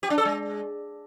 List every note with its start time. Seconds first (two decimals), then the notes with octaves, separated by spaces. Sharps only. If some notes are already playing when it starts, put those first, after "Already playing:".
0.03 G4
0.10 D4
0.18 A4
0.25 G#3